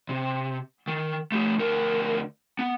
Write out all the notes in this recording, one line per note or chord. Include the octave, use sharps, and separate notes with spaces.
C3
D#3
A3 G4
D2 A#4
B3